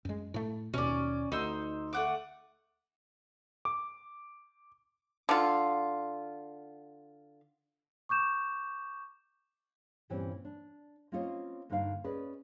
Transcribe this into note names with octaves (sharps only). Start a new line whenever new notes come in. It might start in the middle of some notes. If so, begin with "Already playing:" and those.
F#2 G#3
A2 A3
D#2 B2 C#4 D5
D2 D#4 C6 E6
A3 F#5 D6
D6
D3 F4
C#6 D6 G6 E7
G2 A#2 E3 G3 C4 C#4
D4
A#3 C4 C#4 F4 C#5 D#5
G2 D3 A#3 D#4 A#4 F5
C#4 G#4 B4 D5 D#5